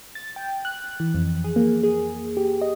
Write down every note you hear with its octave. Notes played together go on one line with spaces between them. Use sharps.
A6
G5
F#6
E3
F2
G#4
A#3
G#4
G4
D#5